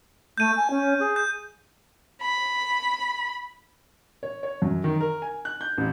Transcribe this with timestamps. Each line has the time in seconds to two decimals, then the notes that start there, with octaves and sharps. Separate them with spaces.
0.38 A3 G6 D#7
0.56 G#5
0.70 C#4
0.99 G#4
1.16 G6
2.21 B5
4.23 C#5
4.43 C#5
4.62 F#2
4.84 D#3
5.00 A#4
5.22 G#5
5.45 F#6
5.61 G6
5.78 A1